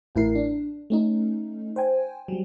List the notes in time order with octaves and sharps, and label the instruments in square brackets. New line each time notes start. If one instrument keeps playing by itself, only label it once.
[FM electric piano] A1 A2 E4 A#4 C7
D4
A3 C#4 D#4
C5 G5 G#5
F#3 G3